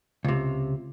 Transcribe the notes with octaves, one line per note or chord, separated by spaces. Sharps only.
C#2 C3